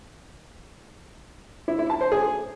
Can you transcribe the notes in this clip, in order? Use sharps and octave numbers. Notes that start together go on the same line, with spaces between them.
E4
E4
A5
C5
G#4